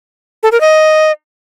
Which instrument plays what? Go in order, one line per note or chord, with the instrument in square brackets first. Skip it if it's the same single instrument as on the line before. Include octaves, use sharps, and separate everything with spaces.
[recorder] A4
A#4
D#5